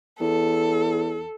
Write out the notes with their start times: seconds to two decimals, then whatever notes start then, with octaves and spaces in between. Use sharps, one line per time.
0.20 E2 A4